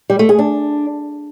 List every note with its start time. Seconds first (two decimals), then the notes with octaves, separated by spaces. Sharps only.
0.10 G3
0.19 A3
0.29 G#4
0.39 D4